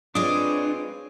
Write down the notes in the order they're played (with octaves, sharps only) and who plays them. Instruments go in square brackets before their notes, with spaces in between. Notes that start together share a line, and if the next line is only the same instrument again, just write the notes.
[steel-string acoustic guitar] G#3 F4 [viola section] C4 B4 C#5 [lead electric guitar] D4 [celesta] D#6